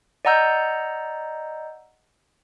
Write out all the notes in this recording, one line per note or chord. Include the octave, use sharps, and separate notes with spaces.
D5 D#5 F#5 A#5 E6 G6